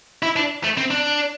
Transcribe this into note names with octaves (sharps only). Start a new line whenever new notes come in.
E4
D4
A3
C4
D4